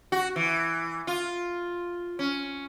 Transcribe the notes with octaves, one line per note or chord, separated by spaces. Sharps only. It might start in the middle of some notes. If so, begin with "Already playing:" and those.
F#4
E3
F4
C#4